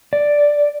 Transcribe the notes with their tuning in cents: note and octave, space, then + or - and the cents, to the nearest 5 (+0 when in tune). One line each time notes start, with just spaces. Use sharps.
D5 +0